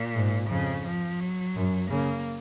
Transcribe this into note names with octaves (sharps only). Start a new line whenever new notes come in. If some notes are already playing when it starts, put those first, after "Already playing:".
Already playing: A#2
G#2
F2 C#3
F3
F#3
F#2
C#3 A#3